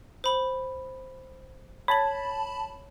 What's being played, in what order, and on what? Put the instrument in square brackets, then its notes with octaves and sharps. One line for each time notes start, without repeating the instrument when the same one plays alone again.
[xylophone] C5 B5 F#7
[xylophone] C#5 F#7 [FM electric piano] A5 B5